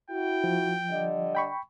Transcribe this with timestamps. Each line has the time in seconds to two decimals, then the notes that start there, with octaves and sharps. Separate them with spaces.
0.10 E4 F#4 G5
0.44 F3
0.89 D3 G3 D#5
1.35 G5 B5 C#6